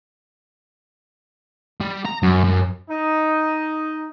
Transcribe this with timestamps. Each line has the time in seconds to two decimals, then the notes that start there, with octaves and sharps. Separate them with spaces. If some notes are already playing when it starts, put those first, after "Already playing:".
1.81 G3
2.05 A#5
2.23 F#2
2.44 F#2
2.89 D#4